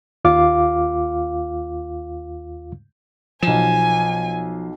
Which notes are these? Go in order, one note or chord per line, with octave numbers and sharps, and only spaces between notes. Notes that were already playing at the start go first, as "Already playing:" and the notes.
D#2 F4 F5 D6
B1 F3 G#5 E7